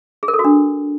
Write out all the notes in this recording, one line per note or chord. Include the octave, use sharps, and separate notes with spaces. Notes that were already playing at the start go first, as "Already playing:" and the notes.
G#4
A#4
A4
F#4
D4